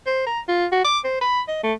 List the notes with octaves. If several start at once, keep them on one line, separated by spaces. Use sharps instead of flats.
C5
A#5
F4
F#4
D6
C5
B5
D#5
A3